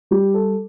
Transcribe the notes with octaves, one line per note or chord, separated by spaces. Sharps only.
G3 G4
A4